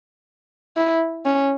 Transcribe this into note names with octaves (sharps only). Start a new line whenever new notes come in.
E4
C#4